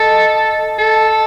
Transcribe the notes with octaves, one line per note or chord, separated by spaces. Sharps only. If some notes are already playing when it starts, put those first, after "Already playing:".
Already playing: A4 D#5
A4